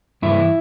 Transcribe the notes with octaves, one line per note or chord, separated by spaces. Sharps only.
G2 E3 E4